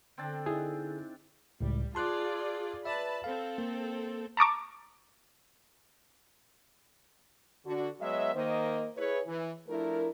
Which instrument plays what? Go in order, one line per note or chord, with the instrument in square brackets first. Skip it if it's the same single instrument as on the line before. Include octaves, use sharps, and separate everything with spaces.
[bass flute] D3 [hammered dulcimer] C4 D4 A5
[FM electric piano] D#4 E4 [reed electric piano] G#4
[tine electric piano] C#2 A2 [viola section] G3
[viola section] F4 G#4 D5 [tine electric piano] A5 C6 F#6
[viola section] B4 A5 B5 [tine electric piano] D5 E5
[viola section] C4 A4 [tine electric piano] F5
[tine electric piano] A#3
[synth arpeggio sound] A5 A#5 C#6 D6
[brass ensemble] D3 D4 F#4
F#3 G#3 B3 C#5 D#5 E5
D#3 A#3 C5 D#5
E4 G#4 B4 C#5
E3
F3 A3 D4 E4 A#4